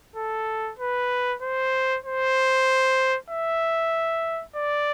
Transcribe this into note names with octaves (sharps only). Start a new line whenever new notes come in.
A4
B4
C5
C5
E5
D5